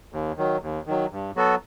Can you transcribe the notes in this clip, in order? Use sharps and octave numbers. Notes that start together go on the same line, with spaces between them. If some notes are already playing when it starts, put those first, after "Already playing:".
D#2
D#3 F#3
D#2
D#3 F#3
G2
F#3 B3 F#4 A4